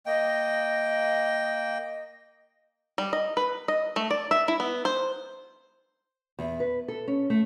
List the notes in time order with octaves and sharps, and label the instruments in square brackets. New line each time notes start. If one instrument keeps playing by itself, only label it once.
[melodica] A#3 G5 [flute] D#5
[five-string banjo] G3
D#5
B4
D#5
A3
D5
E5
E4
B3
C5
[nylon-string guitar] E2
B4
A4
C#4
A3